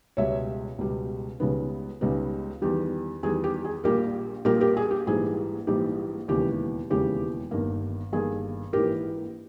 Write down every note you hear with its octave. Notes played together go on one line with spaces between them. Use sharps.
C#2 B2 G3 C#5 E5
C#2 B2 G3
C#2 C#3 G3 B3 D#4
C#2 C#3 G3 B3 D#4
E2 D#3 G3 G4
E2 D#3 G3 G#4
G4
G#4
A#1 A#2 G3 G4 A#4
A#1 A#2 G3 G4 A#4
G4 A#4
G#4
G4
A#1 G#2 E3 G3 G#4
A#1 G#2 E3 G3 G4
E1 D#2 C#3 E3 G#3 G4
E1 D#2 C#3 E3 G#3 G4
G1 G2 D#3 A#3
G1 G2 D#3 A#3 G#4
A#1 G#2 E3 G4 A#4